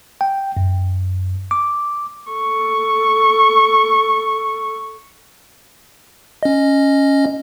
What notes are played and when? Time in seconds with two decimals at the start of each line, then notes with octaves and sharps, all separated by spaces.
0.21 G5
0.57 F#2
1.51 D6
2.30 A4 C#6
6.43 C#4 D#5